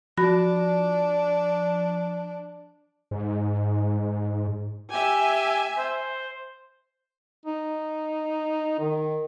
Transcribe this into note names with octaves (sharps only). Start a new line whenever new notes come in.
F3 D4 F#4 B5 A#6
G#2
G4 E5 G#5
C5
D#4
D#3